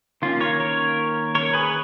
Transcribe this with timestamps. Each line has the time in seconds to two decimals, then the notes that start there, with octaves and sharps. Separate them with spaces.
0.22 D#3 A#3 C#4 F4
0.40 A#4 C#5
0.60 A#4 C#5
1.35 A#4 C#5
1.54 G#4 B4